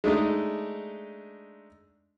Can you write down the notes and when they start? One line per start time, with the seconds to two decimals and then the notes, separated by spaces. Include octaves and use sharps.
0.04 G#3 A3 D4 D#4